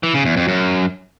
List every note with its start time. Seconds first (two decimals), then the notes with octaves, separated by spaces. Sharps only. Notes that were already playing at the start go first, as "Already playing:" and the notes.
0.03 E3
0.14 C#3
0.25 E2
0.37 F2
0.48 F#2